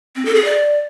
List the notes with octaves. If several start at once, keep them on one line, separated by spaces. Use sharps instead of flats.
C4
A4
G#4
D5